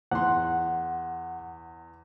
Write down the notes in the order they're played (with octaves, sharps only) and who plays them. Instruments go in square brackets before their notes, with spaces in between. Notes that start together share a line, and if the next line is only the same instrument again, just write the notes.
[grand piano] E2 C6 [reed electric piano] F#5